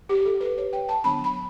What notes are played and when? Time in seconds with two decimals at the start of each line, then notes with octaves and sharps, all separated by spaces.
0.09 G4
0.25 A4
0.41 B4
0.58 C#5
0.73 G5
0.89 A5
1.04 D3 F#3 B3 D4 B5
1.24 B5